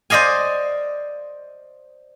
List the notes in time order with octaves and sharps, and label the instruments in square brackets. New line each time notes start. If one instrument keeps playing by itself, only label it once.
[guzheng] C5 D5 D#5 F5 G#5